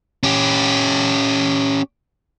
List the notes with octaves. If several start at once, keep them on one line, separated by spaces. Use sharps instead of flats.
C#4 G4